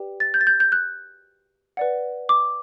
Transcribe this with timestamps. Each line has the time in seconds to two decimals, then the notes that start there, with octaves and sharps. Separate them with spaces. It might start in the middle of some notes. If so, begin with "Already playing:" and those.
Already playing: G4 B4 D5 G5
0.20 A6
0.34 G6
0.41 A6
0.47 G6
0.60 G6
0.72 F#6
1.77 B4 D5 F#5
2.29 D6